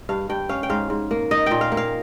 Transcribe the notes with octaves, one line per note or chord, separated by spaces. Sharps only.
G2 F5
G2 G5
C#4 F5
G5
G#2 F5
G#2
A#3
D#4 D#5
A#2 G5
F5
A#3
F5